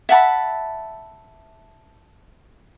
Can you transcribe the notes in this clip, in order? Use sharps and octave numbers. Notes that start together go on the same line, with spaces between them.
E5 F#5 A5 B5